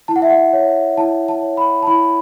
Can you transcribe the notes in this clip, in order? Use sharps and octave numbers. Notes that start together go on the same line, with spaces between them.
E4 A5
F#5
E5
F#5
C#5
E4 A5
A5
C#5
B5
A5
E4 B5